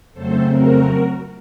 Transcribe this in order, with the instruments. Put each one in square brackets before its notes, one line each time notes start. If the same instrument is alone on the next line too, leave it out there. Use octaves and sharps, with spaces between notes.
[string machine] F2 C#3 F#3 A3 C4 A4 C5
F#4 A#4